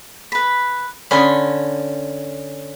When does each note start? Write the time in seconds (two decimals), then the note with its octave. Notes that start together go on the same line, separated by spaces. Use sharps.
0.32 B4 B5
1.11 D3 C#4 B5 C6 D#6